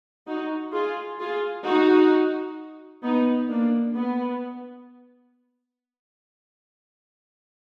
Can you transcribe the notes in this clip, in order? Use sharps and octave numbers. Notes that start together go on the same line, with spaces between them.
D#4 F#4
F4 G#4
F4 G#4
D#4 F#4
B3 D#4
A#3 D4
B3